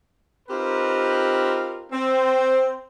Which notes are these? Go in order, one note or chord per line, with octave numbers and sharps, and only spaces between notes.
C4 D#4 F4 G4 A#4 B4
C4